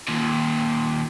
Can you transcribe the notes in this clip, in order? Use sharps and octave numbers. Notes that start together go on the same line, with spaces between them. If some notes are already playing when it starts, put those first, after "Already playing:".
D#2 A#2